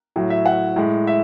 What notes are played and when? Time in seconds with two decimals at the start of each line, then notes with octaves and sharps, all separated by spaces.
0.16 A2 F#3
0.30 E5
0.46 F#5
0.76 A2 G#3
1.07 E5